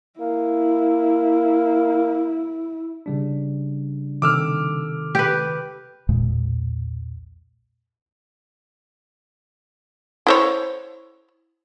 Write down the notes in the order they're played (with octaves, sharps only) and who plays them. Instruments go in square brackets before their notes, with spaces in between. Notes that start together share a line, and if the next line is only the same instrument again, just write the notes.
[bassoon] A#3 [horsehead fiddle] E4
[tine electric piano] C#3 G3 D4
[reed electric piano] C3 D#3 A4 [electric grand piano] D6 E6 F6
[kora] G4 B4
[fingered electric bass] B1 E2 A#2 G#3
[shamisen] E4 C5 C#5